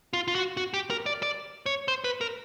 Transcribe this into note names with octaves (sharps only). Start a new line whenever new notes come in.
F4
F4
F#4
F#4
G4
A#4
D5
D5
C#5
C5
B4
A#4